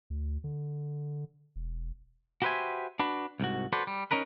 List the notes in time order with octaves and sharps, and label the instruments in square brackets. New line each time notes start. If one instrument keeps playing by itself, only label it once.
[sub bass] D2
D3
E1
[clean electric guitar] F#4 G4 B4 C5 E5 G#5
D4 F#4 B4
C2 G#2 F#4
F#4 A4 B4 C5 D5
G3
C#4 D#4 A#4 B4